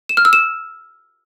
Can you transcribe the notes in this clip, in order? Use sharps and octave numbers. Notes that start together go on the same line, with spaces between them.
E7
F6
E6
E7